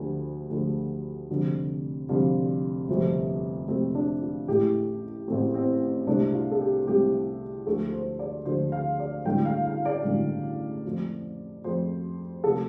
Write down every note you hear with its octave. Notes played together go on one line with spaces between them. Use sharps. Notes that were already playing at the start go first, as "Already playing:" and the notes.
Already playing: D2 D3 F3 A3 G4
D2 D3 F3 A3
F1 F2 D3 G3
F1 F2 D3 G3 F4
G1 F2 C3 F3 A3
G1 F2 C3 F3 A3 C4
D4
F4
A1 A2 A3 G4
A1 A2 A3 C4
C4
C2 C3 A3 D4
F4
A4
G4
C2 C3 A3 G4
D2 D3 F3 A3 A4
C5
D5
D2 D3 F3 A3 C5
F5
D5
A1 G2 D3 A3 G5
F5
F5
D5
A1 G2 D3 A3
F2 F3 A3
F2 F3 A3 C5
C3 F3 A3 A4